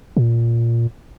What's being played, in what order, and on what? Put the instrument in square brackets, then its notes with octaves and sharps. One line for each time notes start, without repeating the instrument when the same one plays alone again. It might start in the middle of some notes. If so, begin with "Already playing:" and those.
[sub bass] A#2